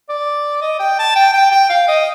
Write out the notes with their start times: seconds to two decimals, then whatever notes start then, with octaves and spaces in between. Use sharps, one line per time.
0.09 D5
0.62 D#5
0.80 G5
0.99 A5
1.16 G5
1.34 G5
1.51 G5
1.70 F5
1.88 D#5